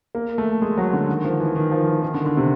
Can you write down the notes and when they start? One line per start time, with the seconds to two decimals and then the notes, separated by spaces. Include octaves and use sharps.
0.15 A#3
0.38 A3
0.62 G#3
0.77 F#3
0.93 D3
1.09 D#3
1.24 F3
1.40 E3
1.56 D#3
1.71 F3
1.87 E3
2.02 D#3
2.14 D3
2.26 D3
2.37 C3